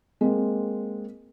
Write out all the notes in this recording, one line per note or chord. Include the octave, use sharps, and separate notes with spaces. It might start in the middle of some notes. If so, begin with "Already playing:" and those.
G#3 A#3 C4